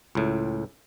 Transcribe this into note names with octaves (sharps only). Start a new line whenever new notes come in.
C#2 A2